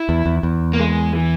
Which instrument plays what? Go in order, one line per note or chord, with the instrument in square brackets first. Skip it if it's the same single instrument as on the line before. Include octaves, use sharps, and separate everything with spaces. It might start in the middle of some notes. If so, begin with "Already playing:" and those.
Already playing: [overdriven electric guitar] E4
[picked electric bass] E2
E2
E2
[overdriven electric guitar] A#3
G#3
E3